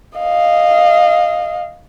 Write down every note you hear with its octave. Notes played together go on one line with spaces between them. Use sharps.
D#5 F5